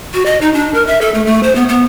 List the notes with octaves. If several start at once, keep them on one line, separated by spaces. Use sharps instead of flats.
F#4
D#5
D#4
D4
A#4
E5
A4
A3
A3
C5
B3
B3